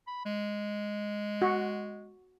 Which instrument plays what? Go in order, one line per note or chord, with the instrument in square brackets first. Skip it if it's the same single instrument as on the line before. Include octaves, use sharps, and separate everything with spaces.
[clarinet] B5
G#3
[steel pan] F#4